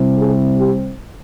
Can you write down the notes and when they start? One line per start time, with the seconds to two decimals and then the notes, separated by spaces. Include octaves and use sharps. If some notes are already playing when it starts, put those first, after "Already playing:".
Already playing: C3 G3 C4 E4
0.17 G#4
0.56 G4